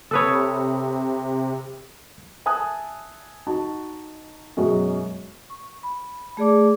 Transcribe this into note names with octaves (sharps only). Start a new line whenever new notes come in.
C3 A4 B4 C#5 B5 D#6 E6
E5 G#5 A5 D#6 F#6
D#4 F#4 A5
F#2 B2 F#3 G#3
C#6
B5
A3 G#4 D5 D6